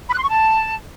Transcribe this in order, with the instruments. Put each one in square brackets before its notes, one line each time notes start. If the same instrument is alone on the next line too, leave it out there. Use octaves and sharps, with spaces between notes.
[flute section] B5
F#6
C6
C#6
A5